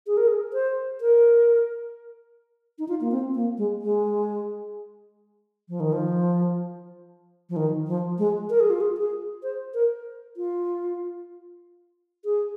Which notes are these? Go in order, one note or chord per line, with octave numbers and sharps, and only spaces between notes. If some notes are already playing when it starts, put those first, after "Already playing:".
G#4
A#4
G#4
C5
A#4
D#4
F4
A#3
C4
A#3
G#3
G#3
F3
D#3
F3
F3
D#3
F3
G#3
A#4
G#4
F4
G#4
G#4
C5
A#4
F4
G#4